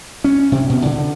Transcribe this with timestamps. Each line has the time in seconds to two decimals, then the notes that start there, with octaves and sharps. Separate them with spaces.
0.24 C#4
0.52 C3
0.70 B2
0.85 D3